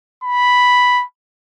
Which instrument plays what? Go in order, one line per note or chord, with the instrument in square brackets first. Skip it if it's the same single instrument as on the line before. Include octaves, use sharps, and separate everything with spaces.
[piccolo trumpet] B5